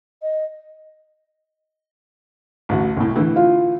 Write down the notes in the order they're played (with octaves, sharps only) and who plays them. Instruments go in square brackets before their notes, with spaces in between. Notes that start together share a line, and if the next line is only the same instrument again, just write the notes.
[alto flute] D#5
[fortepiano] A1 D2 F#4
C2 A2
A2 D3 E3
[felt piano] F4 F5